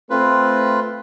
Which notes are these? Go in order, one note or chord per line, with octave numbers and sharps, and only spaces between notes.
A3 C4 F4 B4